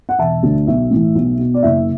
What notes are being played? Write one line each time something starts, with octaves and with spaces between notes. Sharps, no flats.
F#5
E1 E5 A5
D2 D3
B1 E5
A2 E3
B1
B2
D5
F#1 E5